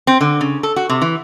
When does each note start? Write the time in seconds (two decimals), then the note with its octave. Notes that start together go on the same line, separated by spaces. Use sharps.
0.07 C4
0.21 D3
0.41 C#3
0.63 A4
0.76 F#4
0.89 C3
1.02 E3